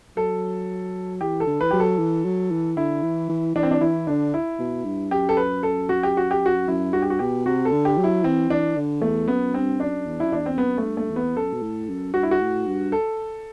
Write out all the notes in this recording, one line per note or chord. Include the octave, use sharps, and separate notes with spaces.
F#3 A4
E3 G4
A4
D3
E3 B4
F#3 G4
A4
E3
F#3
E3
D3 E4
E3
E3
E3 D4
C4
D4
E3 E4
D3 D4
E4
B2
G2
F#2 G4
A4
B4
A4
F#4
G4
F#4
G4
F#4
F#2 E4
G2 F#4
G4
F#4
B2 G4
C3 F#4
A4
D3
G4
F#3
E4
E3 C4
E3 D4
D3
E2 A3
F#2 B3
G2 C4
F#2 D4
E2
F#2 E4
E2 D4
C4
F#2 B3
A3
G2
A3
E2
B3
F#2 A4
B2
A2
F#2
G2 F#4
E4
F#4
A2
G2
A4